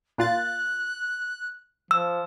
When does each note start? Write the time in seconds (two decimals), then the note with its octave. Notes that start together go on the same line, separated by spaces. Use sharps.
0.18 A#2 F4 F#6 A6
1.91 F3 E6